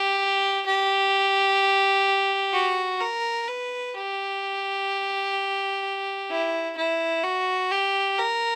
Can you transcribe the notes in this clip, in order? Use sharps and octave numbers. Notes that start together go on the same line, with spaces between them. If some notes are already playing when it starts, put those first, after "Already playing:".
Already playing: G4
G4
F#4
A#4
B4
G4
E4
E4
F#4
G4
A#4